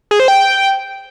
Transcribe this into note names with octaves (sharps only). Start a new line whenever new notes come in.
G#4
C5
G5